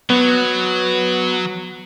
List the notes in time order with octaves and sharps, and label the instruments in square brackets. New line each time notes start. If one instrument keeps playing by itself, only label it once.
[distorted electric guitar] F#3 [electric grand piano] B3